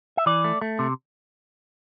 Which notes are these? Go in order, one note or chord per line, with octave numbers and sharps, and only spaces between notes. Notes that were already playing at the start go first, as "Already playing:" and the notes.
E5
E3 D5
A3
A3
C3